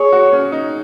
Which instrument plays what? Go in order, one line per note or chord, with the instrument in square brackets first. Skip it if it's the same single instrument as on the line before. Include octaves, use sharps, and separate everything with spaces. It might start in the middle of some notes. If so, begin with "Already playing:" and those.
Already playing: [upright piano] G#4 [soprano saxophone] C#5
[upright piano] F#4
C#4
D#4